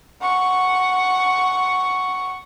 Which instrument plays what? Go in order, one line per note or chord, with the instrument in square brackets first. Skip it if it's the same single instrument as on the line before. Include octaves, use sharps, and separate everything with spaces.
[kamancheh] F#5 C#6